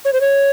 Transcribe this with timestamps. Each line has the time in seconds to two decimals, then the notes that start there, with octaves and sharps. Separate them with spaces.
0.05 C#5
0.13 C5
0.21 C#5